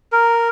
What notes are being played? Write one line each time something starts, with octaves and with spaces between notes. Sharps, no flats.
A#4